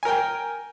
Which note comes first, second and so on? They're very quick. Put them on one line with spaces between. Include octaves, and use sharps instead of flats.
G#5 A#4 G5